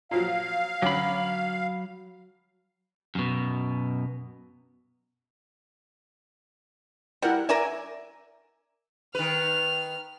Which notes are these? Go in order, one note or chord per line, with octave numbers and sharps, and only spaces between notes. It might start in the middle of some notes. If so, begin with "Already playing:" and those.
A#2 F3 F#3 F5
D2 F#3 C#4 B5 D6
F#2 B2
G3 E4 A#4 F#5
A#4 D5 E5 G#5
D#3 B4 F6